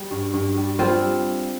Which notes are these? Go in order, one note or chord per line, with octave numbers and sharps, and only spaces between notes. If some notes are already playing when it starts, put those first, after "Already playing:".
Already playing: G3
G2
G2
G3
G3 C4 F4